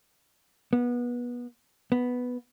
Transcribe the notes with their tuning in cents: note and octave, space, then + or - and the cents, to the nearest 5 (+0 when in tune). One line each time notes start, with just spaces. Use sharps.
B3 -25
B3 +0